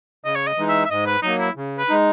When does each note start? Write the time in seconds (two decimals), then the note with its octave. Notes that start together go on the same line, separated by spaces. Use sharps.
0.25 C#3 D#5
0.36 C#5
0.47 D#5
0.57 E3 G#3 D#4
0.69 E5
0.85 E5
0.90 G#2 D#5
1.06 B4
1.23 F#3 A#3 D#4
1.40 E4
1.56 C#3
1.79 B4
1.89 G#3 D#4